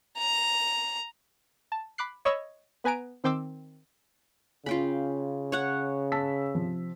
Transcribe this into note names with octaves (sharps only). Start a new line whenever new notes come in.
A#5
A5
B5 D6 F#6 C7
C#5 D#5 B5 C#6 E6
B3 B4 G#5 A#5 D7
D#3 C4 G5 C6 D6 E6
C#3 C#4 F4 G5 B5
C#5 F#5
A5 E6 B6
C3 F3